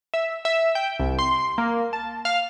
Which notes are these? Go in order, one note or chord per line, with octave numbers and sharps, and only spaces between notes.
E5
E5
G5
C2
C6
A#3
A5
F5